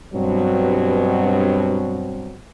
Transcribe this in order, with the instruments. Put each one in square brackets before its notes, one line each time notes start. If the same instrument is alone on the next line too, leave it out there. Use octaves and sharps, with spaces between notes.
[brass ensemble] G2 B2 F#3 C4